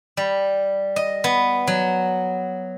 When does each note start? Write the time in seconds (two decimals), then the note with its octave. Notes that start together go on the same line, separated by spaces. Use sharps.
0.17 G3
0.96 D#5
1.24 B3
1.67 F#3